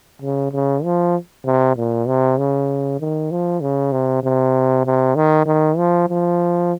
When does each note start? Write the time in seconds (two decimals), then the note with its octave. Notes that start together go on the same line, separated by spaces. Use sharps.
0.22 C#3
0.52 C#3
0.84 F3
1.46 C3
1.76 A#2
2.07 C3
2.38 C#3
3.00 D#3
3.31 F3
3.61 C#3
3.92 C3
4.23 C3
4.85 C3
5.16 D#3
5.46 D#3
5.77 F3
6.08 F3